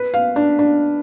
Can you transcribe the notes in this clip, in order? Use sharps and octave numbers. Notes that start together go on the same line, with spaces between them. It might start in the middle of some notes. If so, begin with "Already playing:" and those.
Already playing: B4
F5
D4
D4